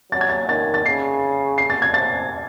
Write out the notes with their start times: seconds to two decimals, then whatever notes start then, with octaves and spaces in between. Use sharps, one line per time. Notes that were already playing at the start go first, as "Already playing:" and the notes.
0.12 F#3 A6
0.21 G#6
0.29 A6
0.48 D#3 A6
0.74 A6
0.85 C#3 C7
1.58 C7
1.70 A6
1.82 G#6
1.94 C3 A6